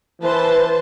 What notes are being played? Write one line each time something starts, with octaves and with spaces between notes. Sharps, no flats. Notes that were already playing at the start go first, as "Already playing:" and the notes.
E3 B4 C5 A5